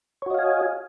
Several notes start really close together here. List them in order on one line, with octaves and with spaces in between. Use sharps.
C#5 F#4 D#5 F5 G#5